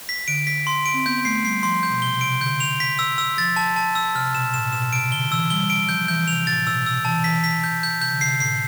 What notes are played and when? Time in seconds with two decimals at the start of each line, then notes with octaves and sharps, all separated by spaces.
0.09 B6
0.28 D3 D7
0.47 B6
0.67 C6
0.86 D7
0.94 C4
1.06 B3 G6
1.25 A3 C7
1.44 G3 C7
1.63 F3 C6
1.83 G6
1.90 B2
2.02 C3 G7
2.21 C3 D7
2.41 D3 G6
2.60 F7
2.80 B6
2.99 E6
3.18 E6
3.37 F3 A6
3.56 A5
3.76 A5
3.95 E6
4.15 C3 F6
4.34 B2 E7
4.54 A2 E7
4.73 B2 E7
4.93 C3 D7
5.12 D3 G7
5.31 E3 E6
5.50 G3 G7
5.70 D7
5.89 F3 G6
6.08 E3 G6
6.28 C3 F7
6.47 A2 A6
6.67 B2 E6
6.86 C3 E6
7.05 E3 A5
7.24 E3 B6
7.44 B6
7.64 G6
7.83 G6
8.01 C3 G6
8.12 D3
8.21 C3 C7
8.40 A2 C7